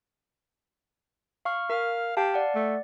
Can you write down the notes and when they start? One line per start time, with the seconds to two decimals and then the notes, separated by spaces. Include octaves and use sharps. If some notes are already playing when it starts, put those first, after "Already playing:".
1.45 F5 C#6 F6
1.70 A#4 F5
2.17 G4 F5 A5
2.34 D5 F#5
2.55 A3